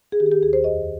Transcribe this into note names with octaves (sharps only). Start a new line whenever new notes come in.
G#4
D#3 G4
G#4
G4
D#2 G#4
C5
F2 D#5